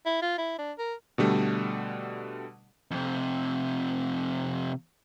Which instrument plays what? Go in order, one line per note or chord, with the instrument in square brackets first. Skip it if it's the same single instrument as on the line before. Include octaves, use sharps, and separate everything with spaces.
[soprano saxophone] E4
F4
E4
D4
A#4
[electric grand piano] B2 D3 G3 A3
[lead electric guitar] F2 C3